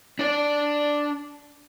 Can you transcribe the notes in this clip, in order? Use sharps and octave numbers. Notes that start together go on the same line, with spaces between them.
D4 D5